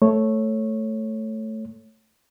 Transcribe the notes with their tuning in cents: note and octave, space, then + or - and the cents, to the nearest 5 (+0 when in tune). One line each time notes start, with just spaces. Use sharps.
A3 +0 C#5 -10